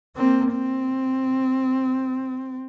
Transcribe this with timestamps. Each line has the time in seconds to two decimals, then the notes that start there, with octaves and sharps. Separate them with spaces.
0.16 A#3 C4
0.52 C4